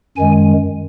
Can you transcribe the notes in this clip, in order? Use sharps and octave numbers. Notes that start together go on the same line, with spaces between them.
F#2 D#3 G#3 G#5